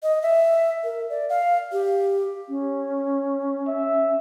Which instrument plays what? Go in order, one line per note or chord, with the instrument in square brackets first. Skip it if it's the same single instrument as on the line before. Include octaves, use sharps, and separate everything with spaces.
[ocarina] D#5
E5
A#4
D5
F5
G4
[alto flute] C#4
[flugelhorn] E5